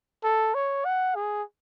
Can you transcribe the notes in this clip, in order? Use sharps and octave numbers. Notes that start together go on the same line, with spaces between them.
A4
C#5
F#5
G#4